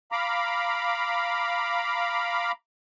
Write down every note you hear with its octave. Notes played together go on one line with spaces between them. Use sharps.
F5 A#5 B5 D6